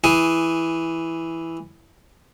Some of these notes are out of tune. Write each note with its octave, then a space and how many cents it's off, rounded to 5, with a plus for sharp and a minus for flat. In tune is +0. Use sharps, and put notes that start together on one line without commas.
E3 +0 G#4 +0